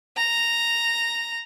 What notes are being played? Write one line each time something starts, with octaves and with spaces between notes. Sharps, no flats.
A#5